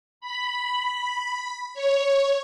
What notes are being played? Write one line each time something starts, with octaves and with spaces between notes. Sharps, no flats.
B5
C#5